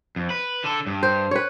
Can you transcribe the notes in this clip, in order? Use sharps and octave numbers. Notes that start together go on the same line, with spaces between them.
F2
B4
D3 A4
G2
C5
B4 C#5